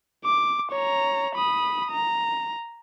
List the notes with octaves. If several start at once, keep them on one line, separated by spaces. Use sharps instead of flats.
D6
C#5 A#5
B5 D#6
A#5